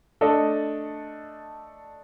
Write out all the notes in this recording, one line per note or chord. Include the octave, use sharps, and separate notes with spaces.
A3 D4 A4 D#5